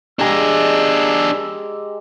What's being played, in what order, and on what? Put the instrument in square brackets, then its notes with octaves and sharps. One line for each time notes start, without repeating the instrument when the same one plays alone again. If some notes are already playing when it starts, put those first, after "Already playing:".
[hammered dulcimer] G#3 G4 A#5 [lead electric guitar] D4 G#4 [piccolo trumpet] E6